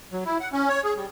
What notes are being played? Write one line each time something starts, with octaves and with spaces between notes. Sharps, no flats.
F#3
E4
F#5
C#4
C#5
G#4
G3